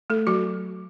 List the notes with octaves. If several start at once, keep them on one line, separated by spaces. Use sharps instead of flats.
A3 A4
F#3 F#4